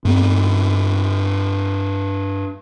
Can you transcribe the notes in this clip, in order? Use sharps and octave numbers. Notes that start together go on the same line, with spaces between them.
G2 B3 C4